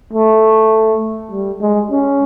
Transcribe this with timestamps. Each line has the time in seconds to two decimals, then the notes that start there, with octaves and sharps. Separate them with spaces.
0.13 A3
1.31 G3
1.61 G#3
1.91 C#4